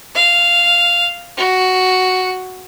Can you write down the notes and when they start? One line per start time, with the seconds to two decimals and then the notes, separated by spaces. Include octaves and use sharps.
0.15 F5
1.37 F#4